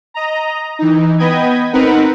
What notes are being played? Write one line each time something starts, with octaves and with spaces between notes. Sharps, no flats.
D#5 A#5
E3 D#4
B3 D#5 G5 B5 G#6
C4 D#4 A#4 B4 F#5 B5